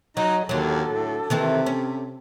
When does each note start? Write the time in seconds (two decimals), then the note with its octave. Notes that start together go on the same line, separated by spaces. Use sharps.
0.17 F#3 D#4 D#5
0.49 D#2 D3 F#3 A4
0.88 A2
1.30 C3 D#3 E3 C4
1.66 C#4